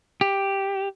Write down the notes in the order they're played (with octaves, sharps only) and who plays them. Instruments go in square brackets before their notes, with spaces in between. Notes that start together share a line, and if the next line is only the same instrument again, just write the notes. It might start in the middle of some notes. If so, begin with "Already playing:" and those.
[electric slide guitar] G4